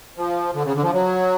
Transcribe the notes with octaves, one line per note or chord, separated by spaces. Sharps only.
F3
D3
C#3
D3
F3
F#3